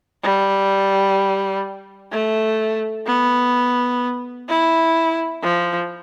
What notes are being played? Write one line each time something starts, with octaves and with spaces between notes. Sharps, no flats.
G3
A3
B3
E4
F3